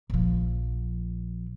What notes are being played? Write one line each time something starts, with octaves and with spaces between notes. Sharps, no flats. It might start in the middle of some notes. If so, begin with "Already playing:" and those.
A#1 F3